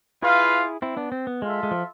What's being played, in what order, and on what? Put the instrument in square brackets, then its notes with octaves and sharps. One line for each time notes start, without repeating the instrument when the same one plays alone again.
[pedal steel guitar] E4 G#4 [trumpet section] F4 B4 F5
[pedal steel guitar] C4 E4
B3 D4
C4
B3
[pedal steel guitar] G#3 [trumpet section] F4 A4 E5
[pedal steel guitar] G#3
F3